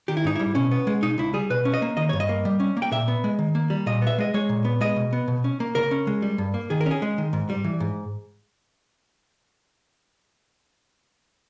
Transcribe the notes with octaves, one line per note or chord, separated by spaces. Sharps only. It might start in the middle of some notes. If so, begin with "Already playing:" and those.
D#3 G4
E4
G#2 D#4
G3 E4
B2 C#4
B3
G#3
B2 D#4
C#2 E4
G3 G#4
B2 B4
C#4
D#5
A#3
D#3 D#5
G2 C#5
D#5
A#3
G3
C#4
A#3
G5
A#2 E5
B3
G#3
D#3
A#3
G3
A#2 D#5
B3 E5
G#3 D#5
G#3 C#5
A#2
B3
G#3 D#5
B2
B3
B2
C#4
A#3
C#3 A#4
C#4
G#3
G3
G2
A#3
D#3 G#4
A#4
C#4 G#4
G#3
D#3
G#2
G3
E3
G#2